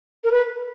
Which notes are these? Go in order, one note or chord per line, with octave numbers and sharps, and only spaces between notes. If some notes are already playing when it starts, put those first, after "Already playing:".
A#4
B4